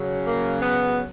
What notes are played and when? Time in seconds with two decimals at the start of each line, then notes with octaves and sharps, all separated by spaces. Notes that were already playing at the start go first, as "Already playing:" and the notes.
Already playing: C#3 F#3
0.26 A#3
0.62 B3